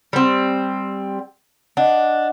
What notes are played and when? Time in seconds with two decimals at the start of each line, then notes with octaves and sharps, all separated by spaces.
0.13 G3 C4
1.77 D4 D#5 F#5